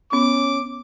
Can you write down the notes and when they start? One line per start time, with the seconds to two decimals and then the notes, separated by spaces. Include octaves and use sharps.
0.13 B3 C#4 D6